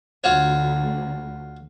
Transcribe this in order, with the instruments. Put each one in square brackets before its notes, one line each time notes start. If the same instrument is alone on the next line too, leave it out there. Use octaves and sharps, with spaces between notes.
[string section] D2 [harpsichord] F4 F#4 C#5